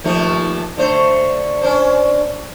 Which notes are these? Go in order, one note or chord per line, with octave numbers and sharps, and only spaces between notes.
D#2 F3 A3
D3 A3 C5
C#4 D4 C5